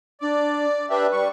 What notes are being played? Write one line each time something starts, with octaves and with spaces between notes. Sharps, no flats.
D4 D5
D4 G4 B4 E5
G3 C#6